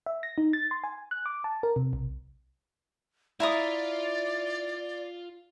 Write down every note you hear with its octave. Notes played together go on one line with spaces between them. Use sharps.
E5
A#6
D#4
A6
C6
G#5
F#6
D6
A5
A#4
C3
B1
E4 F4 D5 F5 A#5 D#6